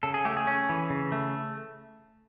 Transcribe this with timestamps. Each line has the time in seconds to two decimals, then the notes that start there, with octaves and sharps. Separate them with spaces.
0.03 C#3 A4
0.14 G#4
0.25 A3 G4
0.37 G#4
0.47 C#4
0.69 E3
0.90 C#3
1.12 A3